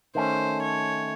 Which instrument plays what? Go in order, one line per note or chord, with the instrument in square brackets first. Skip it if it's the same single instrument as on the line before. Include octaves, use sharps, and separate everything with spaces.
[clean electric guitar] D#3 A3 C#4 [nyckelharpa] C5
[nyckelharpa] C#5